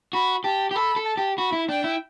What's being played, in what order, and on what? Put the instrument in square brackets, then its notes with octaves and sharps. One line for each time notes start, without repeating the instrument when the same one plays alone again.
[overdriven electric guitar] F#4 [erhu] B5
[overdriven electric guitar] G4 [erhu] A5
[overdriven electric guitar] G4
[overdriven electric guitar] A4 [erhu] B5
[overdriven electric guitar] A4
[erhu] A5
[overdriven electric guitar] G4
[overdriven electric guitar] F#4 [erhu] B5
[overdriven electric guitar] E4
[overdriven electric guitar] D4 [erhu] G5
[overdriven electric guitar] E4